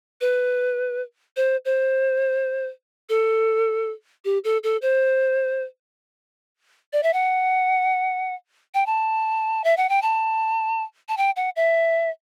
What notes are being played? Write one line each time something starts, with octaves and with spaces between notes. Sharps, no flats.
B4
C5
C5
A4
G4
A4
A4
C5
D5
E5
F#5
G5
A5
E5
F#5
G5
A5
A5
G5
F#5
E5